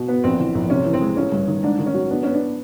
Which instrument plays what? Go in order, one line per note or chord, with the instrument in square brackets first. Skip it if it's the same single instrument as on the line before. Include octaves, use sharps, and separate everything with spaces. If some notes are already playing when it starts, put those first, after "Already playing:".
Already playing: [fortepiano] B2
B3
[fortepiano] A#1 [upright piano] C4
[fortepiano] E3
A#1
[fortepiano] C3 [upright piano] C#4
[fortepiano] E3
[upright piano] C4
[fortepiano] G#3
[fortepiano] A1 [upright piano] C#4
[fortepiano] G2
D#3
[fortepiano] G#2 [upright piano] D4
[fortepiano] D#3
[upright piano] C#4
[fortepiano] F#3
[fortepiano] B3 [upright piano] D4
[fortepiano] B3 [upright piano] C#4
[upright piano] D4